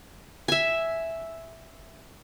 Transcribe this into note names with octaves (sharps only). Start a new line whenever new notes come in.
E5 G#5